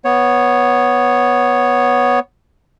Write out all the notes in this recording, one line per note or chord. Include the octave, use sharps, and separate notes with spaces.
B3 C#5